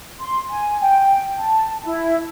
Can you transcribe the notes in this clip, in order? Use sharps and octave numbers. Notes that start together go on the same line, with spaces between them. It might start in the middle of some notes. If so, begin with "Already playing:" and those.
C6
G#5
G5
A5
E4